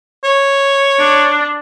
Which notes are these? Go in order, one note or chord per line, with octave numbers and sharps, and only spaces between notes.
C#5
D4